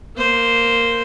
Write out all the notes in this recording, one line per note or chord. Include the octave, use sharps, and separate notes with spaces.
A#3 C5